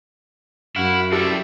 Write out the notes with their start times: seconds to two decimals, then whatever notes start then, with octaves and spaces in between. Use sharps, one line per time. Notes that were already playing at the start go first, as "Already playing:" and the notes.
0.76 F#2 E4 F#4 F5
1.12 G3 C4 E4 G4 A4 E5